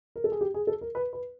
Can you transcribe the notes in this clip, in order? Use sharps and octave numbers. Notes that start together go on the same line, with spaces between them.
A#4
A4
G#4
G4
G#4
A4
A#4
B4
B4